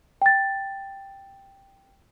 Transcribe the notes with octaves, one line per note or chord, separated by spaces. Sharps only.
G5 A6